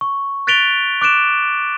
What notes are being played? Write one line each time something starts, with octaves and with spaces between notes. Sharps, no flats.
C#6
F#6 A6 B6 D7 F7 G7
D6 F#6 D7 E7